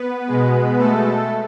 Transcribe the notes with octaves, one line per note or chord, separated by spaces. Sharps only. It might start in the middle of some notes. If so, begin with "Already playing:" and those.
Already playing: B3 B4
B2 G#3
A3 A4